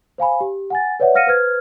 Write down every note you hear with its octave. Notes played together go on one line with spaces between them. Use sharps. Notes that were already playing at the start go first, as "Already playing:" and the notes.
C5 F5 G#5 B5
G4
F#5 G#5 A6
B4 C#5 D5 E5 F#5
F5 F#5 F6 A#6 C#7 D#7
B4 C5 F6 G#6